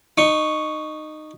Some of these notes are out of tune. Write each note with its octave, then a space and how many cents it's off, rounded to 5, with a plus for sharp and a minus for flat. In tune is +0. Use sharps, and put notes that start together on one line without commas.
D#4 -15 C#6 +0